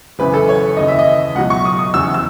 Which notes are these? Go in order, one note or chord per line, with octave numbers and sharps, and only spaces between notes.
G#1 F#2 C#3 E3 B4
A4
C#5
D#2 C#3 E3 D#5
E5
D#5
C#2 B2 F#3 F#5
C#6
D#6
D#6
F#1 E2 C#3 F#3 E6
E6